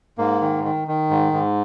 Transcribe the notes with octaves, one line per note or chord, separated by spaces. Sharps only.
G#2 A#3
D#3
D#3
D#3
G#2
G#2